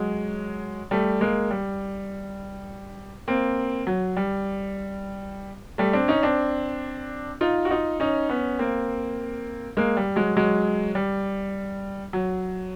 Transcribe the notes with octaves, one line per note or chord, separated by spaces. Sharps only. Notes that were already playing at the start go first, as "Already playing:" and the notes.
Already playing: F#3 G#3
G3 A3
G#3 A#3
G3
A#3 C4
F#3
G3
G3 A3
C4 D4
C#4 D#4
C4 D4
D#4 F4
F#4
D#4 F4
C#4 D#4
B3 C#4
A#3 C4
G#3 A#3
G3
F#3 G#3
F#3 G#3
G3
F#3